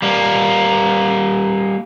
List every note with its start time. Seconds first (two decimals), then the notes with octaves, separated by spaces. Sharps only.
0.02 G3 A#3